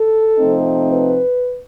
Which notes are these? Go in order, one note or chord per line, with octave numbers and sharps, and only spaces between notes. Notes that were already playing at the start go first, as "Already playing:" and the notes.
Already playing: A4
C3 F3 A3 C4 D#4
B4